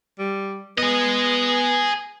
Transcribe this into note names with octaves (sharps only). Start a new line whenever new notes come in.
G3
B3 G#4 D#5